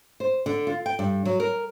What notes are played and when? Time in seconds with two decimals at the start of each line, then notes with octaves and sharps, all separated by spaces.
0.20 C5
0.46 D3
0.67 F4
0.86 G5
0.99 G2
1.25 F#3
1.40 A#4